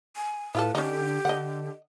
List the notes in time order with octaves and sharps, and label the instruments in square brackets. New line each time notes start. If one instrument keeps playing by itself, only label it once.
[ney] G#5
[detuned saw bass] A2 [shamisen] E4 F4 A4 [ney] B4
[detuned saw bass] D3 [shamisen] C#4 D#4 [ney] G4
[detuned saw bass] D3 [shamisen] D#5 F#5